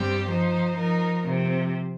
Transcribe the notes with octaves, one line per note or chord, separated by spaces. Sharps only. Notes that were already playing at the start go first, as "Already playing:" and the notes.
Already playing: G2 G3 C4 G4
F3 D#4 C5
F3 D#4 A#4
C3 F3 C4